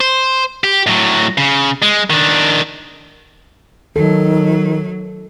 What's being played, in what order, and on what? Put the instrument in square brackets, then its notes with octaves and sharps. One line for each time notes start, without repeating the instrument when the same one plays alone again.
[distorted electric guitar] C5
G4
A2 F#3
C#3
G#3
D#3 D4
[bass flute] D#3 [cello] F#3 [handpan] A4